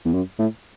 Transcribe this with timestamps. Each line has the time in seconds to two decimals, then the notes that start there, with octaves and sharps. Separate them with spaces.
0.05 E2
0.14 F#2
0.39 A2